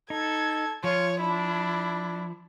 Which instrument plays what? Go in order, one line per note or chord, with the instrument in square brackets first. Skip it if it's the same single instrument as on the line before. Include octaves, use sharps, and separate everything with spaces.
[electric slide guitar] D#4 [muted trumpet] A4 [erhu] G#6
[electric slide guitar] F3 [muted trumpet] F4 [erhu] C#5
[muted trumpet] D4 [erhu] E4